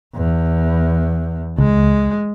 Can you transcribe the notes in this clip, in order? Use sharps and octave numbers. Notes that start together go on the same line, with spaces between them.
E2
C#2 G#3